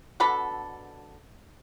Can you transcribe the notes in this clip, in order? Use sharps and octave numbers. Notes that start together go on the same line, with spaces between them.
B2 D3 A4 B5